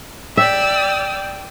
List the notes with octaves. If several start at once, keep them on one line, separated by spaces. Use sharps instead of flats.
D5 E5 G5 E6